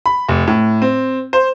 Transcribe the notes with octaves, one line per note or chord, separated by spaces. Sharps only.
B5
F1
A2
C4
C5